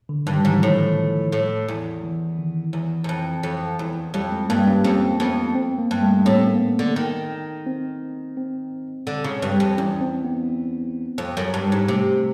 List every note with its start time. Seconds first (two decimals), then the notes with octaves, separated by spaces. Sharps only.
0.09 D3
0.27 G2 D#3
0.45 G#2 E3
0.62 A2 F3
1.32 A2
1.68 E2
2.03 E3
2.39 D#3
2.73 E2 E3
3.04 E2
3.09 F2
3.43 F2
3.79 E2
4.14 F2 G3
4.32 G#3
4.50 G2 A#3
4.67 C#4
4.84 F2 C4
5.20 F2 B3
5.55 C4
5.79 A#3
5.91 G2
6.03 A3
6.25 A2 C4
6.36 B3
6.47 A#3
6.57 B3
6.79 D3
6.96 D#3
7.66 C4
8.37 C4
9.07 D3
9.24 C#3
9.42 G2
9.60 F2
9.78 E2 C#4
10.01 C4
10.25 B3
11.18 F2
11.37 F#2
11.54 G2
11.72 G#2
11.88 C3 A3